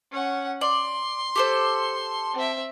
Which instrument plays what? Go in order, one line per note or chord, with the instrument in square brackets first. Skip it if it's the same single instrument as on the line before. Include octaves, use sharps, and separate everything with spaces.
[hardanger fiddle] C#4 F#5
[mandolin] D5 [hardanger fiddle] C6
[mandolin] G4 A4 C5
[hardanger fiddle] C4 E5